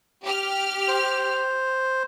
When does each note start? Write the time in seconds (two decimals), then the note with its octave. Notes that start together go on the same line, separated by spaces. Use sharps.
0.24 G4 F6
0.88 C5